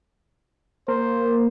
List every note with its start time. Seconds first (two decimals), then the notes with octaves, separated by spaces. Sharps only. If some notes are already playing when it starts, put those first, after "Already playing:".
0.88 A#3 C5